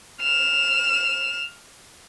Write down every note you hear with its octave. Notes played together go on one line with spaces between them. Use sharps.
F6 E7